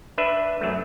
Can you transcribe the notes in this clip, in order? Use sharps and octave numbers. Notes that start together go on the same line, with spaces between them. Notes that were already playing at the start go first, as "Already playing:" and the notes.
D4 B4 E5
F#2 F#3 A3